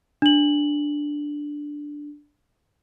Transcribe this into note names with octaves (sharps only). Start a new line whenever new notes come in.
D4 F#7